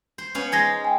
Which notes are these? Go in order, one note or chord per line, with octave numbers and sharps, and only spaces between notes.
C5
B3 C#4 F5
G#3 D#4 G#5 C6 G#6 A#6
G5 G#5